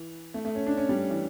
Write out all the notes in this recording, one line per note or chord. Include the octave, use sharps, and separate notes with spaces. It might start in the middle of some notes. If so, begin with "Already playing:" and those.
Already playing: E3
A3
A3
C#4
D4
C#4
G3
E3